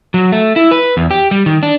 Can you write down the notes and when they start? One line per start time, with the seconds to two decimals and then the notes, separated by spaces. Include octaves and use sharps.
0.14 F#3
0.32 A3
0.56 E4
0.71 B4
0.97 E2
1.11 G4
1.31 G3
1.46 D#3
1.63 D4